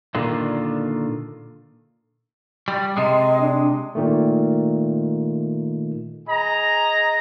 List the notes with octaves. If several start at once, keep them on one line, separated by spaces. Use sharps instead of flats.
A#2 D3 D#3 D4 F4
G3
C3 G#3 D#5
D4
A#2 D#3 A3
G#4 D#5 A#5